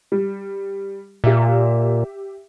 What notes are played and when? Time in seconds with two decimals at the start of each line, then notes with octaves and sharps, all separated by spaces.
0.12 G3
1.24 A#2 G4 E5